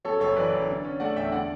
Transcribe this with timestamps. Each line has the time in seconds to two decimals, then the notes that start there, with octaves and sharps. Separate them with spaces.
0.05 F#2 A4 C#5
0.20 F#1 A4 C#5
0.36 E3 B4 D5
0.52 F#1
0.68 D3
0.85 C#4
1.00 A3 D5 F#5
1.16 E2 E5 G5
1.32 D3 D5 F#5